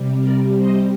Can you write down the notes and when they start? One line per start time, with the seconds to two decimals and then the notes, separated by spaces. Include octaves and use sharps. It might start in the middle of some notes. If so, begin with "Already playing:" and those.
Already playing: C3 G3
0.20 A#4 D5
0.58 C5 D#5